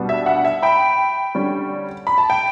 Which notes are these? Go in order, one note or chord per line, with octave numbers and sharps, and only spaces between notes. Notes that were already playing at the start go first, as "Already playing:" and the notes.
Already playing: B2 G3 B3 D4
E5
F#5
E5
G5 B5
D3 G3 C#4
B5
A5
G5